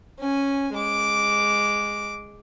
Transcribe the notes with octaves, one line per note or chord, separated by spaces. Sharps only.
C#4 G#5
G#3 D6